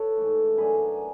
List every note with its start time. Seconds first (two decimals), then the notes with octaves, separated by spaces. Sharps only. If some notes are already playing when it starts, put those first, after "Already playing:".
Already playing: A4 B4 C#5
0.17 G#2 E3 A3
0.57 F#2 D3 F#3 A3 G#4 B4